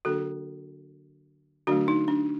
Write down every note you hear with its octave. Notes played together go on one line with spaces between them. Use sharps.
D3 F#3 A#3 D4 F#4 A4
D3 F#3 A3 D4 F#4
D#4
D4